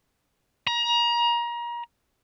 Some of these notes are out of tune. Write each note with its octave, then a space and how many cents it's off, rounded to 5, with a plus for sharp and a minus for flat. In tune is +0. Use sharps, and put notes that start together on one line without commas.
A#5 +30